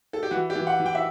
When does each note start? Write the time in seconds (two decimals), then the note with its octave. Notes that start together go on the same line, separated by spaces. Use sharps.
0.13 A4
0.23 G4
0.31 E3 F#4
0.50 G4
0.55 E3
0.67 F#5
0.80 E3
0.86 G5
0.95 E5